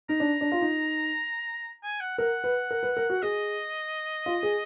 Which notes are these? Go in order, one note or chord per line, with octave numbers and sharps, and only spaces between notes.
D#4 A#5
D4
D4
F4
D#4
G#5
F#5
A#4 F#5
B4
A#4
B4
A#4
F#4
G#4 D#5
F4
G#4